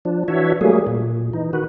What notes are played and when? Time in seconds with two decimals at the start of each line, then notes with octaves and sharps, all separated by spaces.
0.05 F3 D4
0.28 E3 D4 F#4 C#5 E5
0.61 F#3 G3 A3 A#3 G#4
0.87 A#2
1.33 E3 D#4
1.53 D#3 F#4 B4